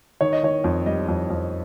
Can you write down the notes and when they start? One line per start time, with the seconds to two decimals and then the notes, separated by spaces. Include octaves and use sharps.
0.21 D#3 C#5
0.33 D#5
0.43 D#3 C#5
0.64 F2
0.86 G3 D#5
1.08 F2
1.30 F2